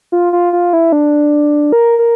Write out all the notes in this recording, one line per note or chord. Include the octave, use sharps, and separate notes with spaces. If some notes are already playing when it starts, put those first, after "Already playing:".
F4
F4
F4
E4
D4
A#4
A#4